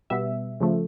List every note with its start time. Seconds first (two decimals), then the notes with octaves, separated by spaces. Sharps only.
0.10 B2 G3 B3 E5
0.60 C#3 F3 A3